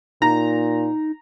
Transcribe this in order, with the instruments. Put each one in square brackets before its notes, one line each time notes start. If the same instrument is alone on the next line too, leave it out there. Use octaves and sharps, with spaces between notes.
[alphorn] A#2 [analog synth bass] D#4 [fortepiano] A#5